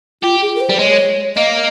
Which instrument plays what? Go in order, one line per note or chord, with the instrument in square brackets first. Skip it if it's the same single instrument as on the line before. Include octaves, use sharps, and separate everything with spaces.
[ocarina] F4 [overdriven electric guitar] G4
[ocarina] G#4
A#4
C5
[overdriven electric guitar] G3
[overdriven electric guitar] G#3 [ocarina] C#5
[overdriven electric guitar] A#3 [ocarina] D#5